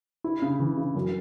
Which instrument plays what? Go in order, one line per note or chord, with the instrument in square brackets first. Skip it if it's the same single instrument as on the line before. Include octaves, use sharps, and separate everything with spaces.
[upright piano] E4
C#3
E3
C#3
F#2